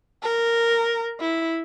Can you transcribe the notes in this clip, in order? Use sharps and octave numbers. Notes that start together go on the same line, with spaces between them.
A#4
E4